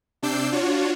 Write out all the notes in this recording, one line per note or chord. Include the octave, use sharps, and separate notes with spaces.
C3 D4 D6 E6 G6 C7
D4 F4 F#4 C#5